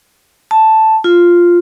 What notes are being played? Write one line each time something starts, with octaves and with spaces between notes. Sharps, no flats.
A5
F4